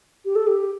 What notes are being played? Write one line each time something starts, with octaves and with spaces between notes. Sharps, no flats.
G4
A4
G4